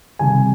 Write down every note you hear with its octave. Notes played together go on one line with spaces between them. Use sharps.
C3 D#3 G3 G#5